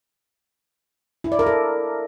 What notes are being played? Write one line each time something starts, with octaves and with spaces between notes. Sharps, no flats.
E4
D5
A#4
A4